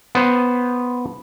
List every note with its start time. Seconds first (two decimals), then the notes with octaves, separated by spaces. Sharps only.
0.15 B3 C5